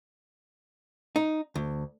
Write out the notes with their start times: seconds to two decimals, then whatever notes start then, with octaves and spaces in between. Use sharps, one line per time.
1.16 D#4
1.55 D2